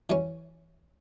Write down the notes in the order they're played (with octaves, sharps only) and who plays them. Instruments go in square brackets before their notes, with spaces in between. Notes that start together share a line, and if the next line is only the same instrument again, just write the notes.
[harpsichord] E3 G3 C#4